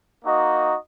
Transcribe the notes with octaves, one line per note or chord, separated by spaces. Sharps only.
A#3 D#4 F#4 D#5